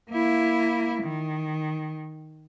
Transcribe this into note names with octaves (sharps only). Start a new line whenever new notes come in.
A#3 E4
D#3